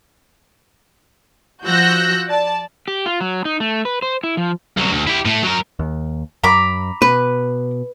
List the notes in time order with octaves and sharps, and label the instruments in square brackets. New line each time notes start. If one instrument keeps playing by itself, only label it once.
[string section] F3 F#4 E6 F#6 G6 A#6
D5 A5
[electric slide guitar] G4
F4
F#3
D#4
A3
B4
C5
E4
F3
[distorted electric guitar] C2 F#3
D2
E4 G4
A2 A3
F#3 A#4
[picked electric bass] D#2
[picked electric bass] F#2 [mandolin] A#5 B5 D6
[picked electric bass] B2 [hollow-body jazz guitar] B4